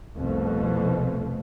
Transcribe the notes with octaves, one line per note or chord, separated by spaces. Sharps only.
C2 F2 B2 A3